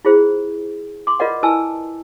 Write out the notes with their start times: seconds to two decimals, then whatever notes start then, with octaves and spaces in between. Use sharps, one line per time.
0.05 E4 F4 G#4 C5
1.07 C6 D6
1.20 F4 A#4 B4 D5 D#5 F#5
1.43 E4 B4 G#5 A5 E6